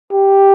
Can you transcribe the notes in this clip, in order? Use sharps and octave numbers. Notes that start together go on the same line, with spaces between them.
G4